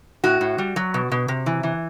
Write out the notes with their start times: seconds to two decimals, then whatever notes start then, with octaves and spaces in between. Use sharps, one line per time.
0.24 A2 F#4
0.41 A2
0.58 G3
0.76 F#3
0.94 B2
1.12 B2
1.28 C3
1.46 E3
1.63 E3